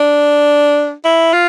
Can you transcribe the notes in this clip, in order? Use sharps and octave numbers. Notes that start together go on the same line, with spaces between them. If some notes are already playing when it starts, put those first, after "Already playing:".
Already playing: D4
E4
F4